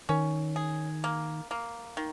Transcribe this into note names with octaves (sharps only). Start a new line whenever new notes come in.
D#3 C#4
G#4
A#3
A#3
D#3